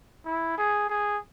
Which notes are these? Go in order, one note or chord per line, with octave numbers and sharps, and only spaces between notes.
E4
G#4
G#4